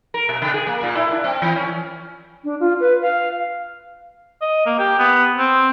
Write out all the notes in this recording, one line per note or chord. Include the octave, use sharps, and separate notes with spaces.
A#4
B2
C#3
G#4
A#3
A#2
E4
D4
C4
E3
C#4
D4
F4
B4
F5
D#5
A#3
G4
B3
C4